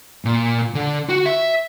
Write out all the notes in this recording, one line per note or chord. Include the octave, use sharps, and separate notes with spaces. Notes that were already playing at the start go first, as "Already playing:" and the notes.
A#2
D3
F#4
E5